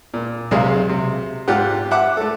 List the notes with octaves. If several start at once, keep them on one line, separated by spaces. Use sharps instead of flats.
A#2
B1 C3 G#3 G#4 F5
C3
G#2 F4 G4 F#5
E5 F#5 D6
A3 A4